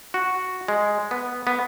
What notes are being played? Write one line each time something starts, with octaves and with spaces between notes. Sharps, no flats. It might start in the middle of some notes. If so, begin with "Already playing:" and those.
F#4
G#3
B3
B3